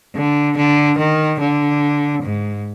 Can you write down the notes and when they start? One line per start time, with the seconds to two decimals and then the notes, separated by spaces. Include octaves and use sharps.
0.16 D3
0.57 D3
0.98 D#3
1.40 D3
2.23 G#2